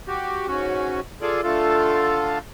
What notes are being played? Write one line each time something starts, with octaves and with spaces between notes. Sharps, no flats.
F#4 G4
G#2 C#4 F#4
F4 G#4 A4 D5
D3 A3 F4 A4